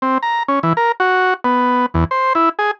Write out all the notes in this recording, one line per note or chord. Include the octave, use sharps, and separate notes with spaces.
C4
A#5
C#4
E3
A#4
F#4
B3
E2
C5
E4
G#4